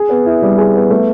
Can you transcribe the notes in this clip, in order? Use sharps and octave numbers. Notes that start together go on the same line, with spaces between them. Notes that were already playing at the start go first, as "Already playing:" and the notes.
Already playing: G#4
B3
E4
G3
G#4
B3
A3